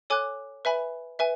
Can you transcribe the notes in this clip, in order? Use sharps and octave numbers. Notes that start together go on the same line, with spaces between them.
A4 C#5 G#5 D6 F#6
B4 E5 G#5 B5
B4 E5 G#5